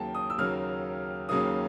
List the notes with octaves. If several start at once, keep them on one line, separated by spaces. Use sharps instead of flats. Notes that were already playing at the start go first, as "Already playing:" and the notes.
Already playing: D#2 C#3 F#3 A#3 G5 A5
D#6
E6
D#2 C#3 F#3 A#3 F6
D#2 C#3 F#3 A#3 D#6